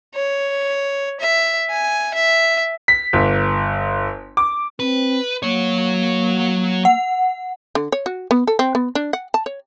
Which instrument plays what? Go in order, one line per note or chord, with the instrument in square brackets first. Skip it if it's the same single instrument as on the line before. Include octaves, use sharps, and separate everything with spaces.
[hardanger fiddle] C#5
E5
G#5
E5
[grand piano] B6
G1
D6
[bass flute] C4 [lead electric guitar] B4
[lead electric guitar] F#3 C#5 [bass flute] A#3
[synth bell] F#5
[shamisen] D3
C#5
F#4
B3
A4
C4
B3
D4
F#5
A5
C#5